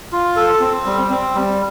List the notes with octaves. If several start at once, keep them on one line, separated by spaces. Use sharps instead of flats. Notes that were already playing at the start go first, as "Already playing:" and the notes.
F4
A4
C4
G3
C4
G3